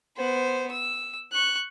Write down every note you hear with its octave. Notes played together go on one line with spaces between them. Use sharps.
B3 C5
E6
C#6 F#6